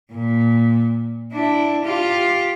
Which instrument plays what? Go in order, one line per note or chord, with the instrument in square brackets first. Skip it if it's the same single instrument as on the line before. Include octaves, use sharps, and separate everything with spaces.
[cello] A#2
D4 E4
F4 G4